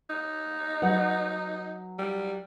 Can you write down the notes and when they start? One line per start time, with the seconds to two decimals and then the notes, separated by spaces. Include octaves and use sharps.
0.10 D#4
0.82 F#3 B4 F#5
1.99 G3